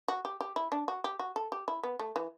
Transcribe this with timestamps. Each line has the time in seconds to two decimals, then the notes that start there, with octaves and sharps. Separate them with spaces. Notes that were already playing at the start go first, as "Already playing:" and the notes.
0.08 F#4
0.25 G4
0.41 G4
0.56 E4
0.72 D4
0.88 F#4
1.04 G4
1.19 F#4
1.36 A4
1.52 G4
1.68 E4
1.83 B3
1.99 A3
2.16 E3